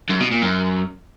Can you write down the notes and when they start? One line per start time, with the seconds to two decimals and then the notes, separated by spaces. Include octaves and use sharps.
0.10 F#2
0.21 B2
0.32 A#2
0.42 F#2